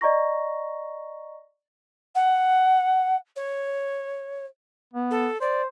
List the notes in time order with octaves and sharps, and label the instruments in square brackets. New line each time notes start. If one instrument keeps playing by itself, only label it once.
[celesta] D5 D#5 A#5 C#6 A#6
[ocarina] F#5
C#5
[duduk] B3
[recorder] A4
[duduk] C5 [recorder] D5